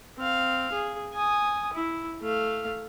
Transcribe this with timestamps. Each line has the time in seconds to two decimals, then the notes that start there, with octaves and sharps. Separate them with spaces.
0.17 C4 F5
0.72 G#4
1.13 G#5 D#6
1.73 E4
2.21 A3 F5